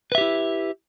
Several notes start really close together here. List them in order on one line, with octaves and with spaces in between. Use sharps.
B4 E5 G4 E4